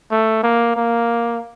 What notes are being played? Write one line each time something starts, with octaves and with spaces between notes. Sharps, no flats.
A3
A#3
A#3